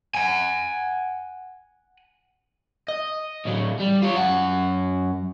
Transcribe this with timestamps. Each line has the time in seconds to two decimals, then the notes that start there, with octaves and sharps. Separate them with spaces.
0.15 F#5 G#5
2.88 D#5
3.46 A2 F#3
3.80 G3
4.02 F4 C#5
4.17 F#2 F#5